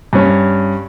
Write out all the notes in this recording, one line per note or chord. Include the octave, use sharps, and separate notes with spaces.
G2 C#4